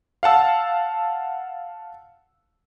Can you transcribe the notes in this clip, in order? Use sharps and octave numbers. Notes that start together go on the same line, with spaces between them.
F5 F#5 A5 E6